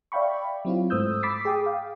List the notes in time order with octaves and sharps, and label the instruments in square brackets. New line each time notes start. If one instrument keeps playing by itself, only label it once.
[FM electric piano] D5 E5 F5 G5 B5 C#6
F#3 C4 E4 F4
G#2 A3 C5 D#6 E6 G6
B5 D6 E6 A6 B6 C7
G#4 G5 D6 D#6
F5 G5